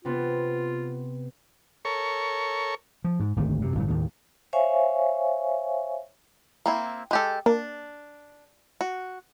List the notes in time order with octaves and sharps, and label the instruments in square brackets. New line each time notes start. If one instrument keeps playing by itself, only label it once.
[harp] C3 B3 C4 [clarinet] F4
[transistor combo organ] A4 A#4 C#5 C#6
[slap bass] F3
G#2
G#1 D2 D#3
F#2 C3
G1 A2 F#3
D#2 A2 D#3
[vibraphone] C5 C#5 E5 F5 G#5 C#6
[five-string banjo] A#3 C4 E4
G#3 G4 A4
[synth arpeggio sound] A#3 [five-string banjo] D4
[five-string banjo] F#4